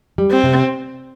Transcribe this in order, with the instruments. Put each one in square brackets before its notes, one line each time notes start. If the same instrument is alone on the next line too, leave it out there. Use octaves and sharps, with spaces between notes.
[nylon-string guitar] G3
[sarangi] C4
[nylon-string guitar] C3